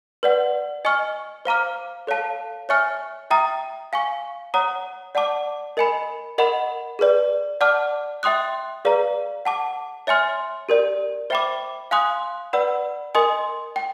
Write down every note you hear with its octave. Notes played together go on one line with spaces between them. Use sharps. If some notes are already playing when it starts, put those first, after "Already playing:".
B4 D5 F#5
D#5 G#5 C#6 F6
C5 F5 A#5 D6 F6
A4 C#5 F5 A5
C#5 E5 G#5 C#6 F6
E5 G5 A#5 D#6
F5 G#5 C#6
C#5 F#5 A#5 D#6
D5 F#5 A5 D6
A#4 D#5 G#5 B5
A#4 D#5 F#5 B5
G#4 B4 D5
D5 F#5 A5 D6 F6
E5 G5 C6 D#6 F#6
G#4 B4 D5 F5 A#5
F#5 A5 D6
C#5 E5 G#5 C6 F6
G4 A#4 D5
C5 E5 G5 B5 D6
F5 G#5 C6 D#6 F#6
B4 D5 F#5 B5 E6
A#4 D#5 G#5 C6 D#6
G5